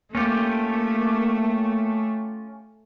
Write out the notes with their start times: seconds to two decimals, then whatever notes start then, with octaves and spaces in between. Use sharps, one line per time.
0.15 A3 A#3 C#4 F4 G4